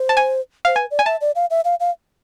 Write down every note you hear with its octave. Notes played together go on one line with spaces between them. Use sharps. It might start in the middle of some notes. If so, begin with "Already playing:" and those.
Already playing: C5
A5
G#5
C5 F5
B4 G#5
D5
G#5
E5 A5
D5
F5
E5
F5
F5